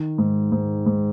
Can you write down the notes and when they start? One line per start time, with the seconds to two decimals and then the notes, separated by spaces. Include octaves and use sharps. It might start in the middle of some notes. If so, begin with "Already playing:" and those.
Already playing: D#3
0.18 G#2
0.52 G#2
0.86 G#2